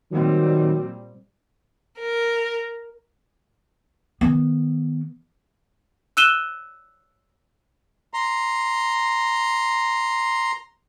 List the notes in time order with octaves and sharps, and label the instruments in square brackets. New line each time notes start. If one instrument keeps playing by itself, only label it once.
[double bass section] A#2 G3 C4 [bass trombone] D#3 [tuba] F#3
[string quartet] A#4
[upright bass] D#3 B3
[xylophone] E6 F#6 D#7 E7 G7
[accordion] A#5 C6